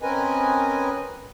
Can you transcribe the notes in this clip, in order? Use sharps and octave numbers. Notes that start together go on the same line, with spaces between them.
C4 C#4 A#4 B4 D#5 G#5